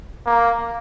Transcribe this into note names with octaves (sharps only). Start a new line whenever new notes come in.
A#3